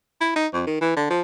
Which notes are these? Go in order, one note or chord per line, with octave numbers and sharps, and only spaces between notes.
E4
D#4
F2
D#3
E3
D3
F3